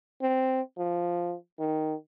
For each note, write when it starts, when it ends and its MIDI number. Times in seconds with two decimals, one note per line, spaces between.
0.22 0.61 60
0.78 1.35 53
1.59 1.94 51